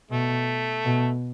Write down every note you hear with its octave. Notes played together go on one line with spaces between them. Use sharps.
B2 A3
B2